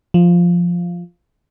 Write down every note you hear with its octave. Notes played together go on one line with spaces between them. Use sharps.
F3